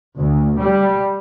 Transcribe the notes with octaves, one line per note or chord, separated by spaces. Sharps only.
D2
G3